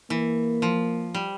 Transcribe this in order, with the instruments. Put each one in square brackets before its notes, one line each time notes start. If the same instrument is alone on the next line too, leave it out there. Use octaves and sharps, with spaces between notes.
[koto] E3 [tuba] A#3
[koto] F3
G3